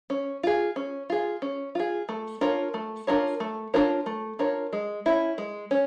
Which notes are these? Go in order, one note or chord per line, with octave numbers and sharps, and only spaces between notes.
C#4
F4 G#4
C#4
F4 G#4
C#4
F4 G#4
A3
D4 F4 A#4 C#5
A3
D4 F4 A#4 C#5
A3
D4 F4 A#4 C#5
A3
D4 F4 A#4 C#5
G#3
C#4 E4
G#3
C#4